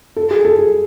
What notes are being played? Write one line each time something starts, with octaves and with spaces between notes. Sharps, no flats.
A4
G#4
A4
G#4